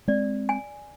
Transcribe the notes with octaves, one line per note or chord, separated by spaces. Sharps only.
G#3 C4 D5
G#5